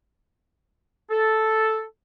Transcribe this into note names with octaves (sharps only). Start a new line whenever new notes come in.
A4